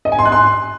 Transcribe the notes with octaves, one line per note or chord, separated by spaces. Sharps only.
D#5
G#5
C6
F#6
C6